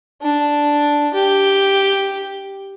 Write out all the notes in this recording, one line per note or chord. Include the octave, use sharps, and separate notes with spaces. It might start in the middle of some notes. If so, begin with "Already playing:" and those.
D4
G4